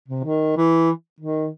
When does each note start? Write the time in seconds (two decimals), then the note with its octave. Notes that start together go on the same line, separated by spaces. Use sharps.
0.08 C3
0.24 D#3
0.57 E3
1.20 D#3